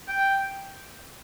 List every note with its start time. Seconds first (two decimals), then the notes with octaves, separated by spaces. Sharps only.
0.08 G5